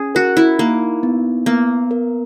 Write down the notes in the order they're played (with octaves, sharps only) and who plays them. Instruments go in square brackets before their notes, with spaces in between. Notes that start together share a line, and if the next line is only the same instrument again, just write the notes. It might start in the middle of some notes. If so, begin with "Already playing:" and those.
Already playing: [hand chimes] C#4 [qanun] G#4
[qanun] F#4 [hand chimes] A#4
[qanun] E4
[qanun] A#3 [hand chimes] D#4
[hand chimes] B3
[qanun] A#3 [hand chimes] B3
[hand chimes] A#4